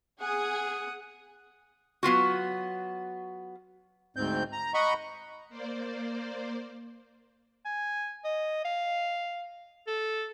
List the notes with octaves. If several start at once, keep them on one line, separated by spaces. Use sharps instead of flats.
G#4 F#5 D#6
F#3 B3 F4 F#4
D2 G#2 C4 G6
A#5
D#5 F#5 A#5 B5 C#6
A#3 C5 D5
G#5
D#5
F5
A4